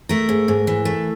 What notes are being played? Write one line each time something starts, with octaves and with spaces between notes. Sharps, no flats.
A3 A#4
G#2
G#2
E3
A3